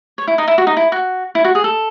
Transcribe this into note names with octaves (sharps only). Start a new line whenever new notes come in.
C#5
E4
D#4
E4
F#4
D#4
E4
F#4
E4
F#4
G#4
A4